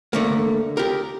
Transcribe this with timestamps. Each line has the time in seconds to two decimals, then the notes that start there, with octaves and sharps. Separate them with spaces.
0.13 D3 A3 A#3
0.77 G4 A#4